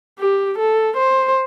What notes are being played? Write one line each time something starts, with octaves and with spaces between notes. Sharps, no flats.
G4
A4
C5